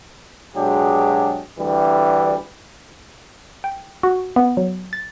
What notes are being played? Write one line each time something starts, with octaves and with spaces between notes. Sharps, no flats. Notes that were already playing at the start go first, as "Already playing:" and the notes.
B2 F#3 G#3 D4 G4 G#4
D2 E3 G3
G5
F#4
B3
F#3
A6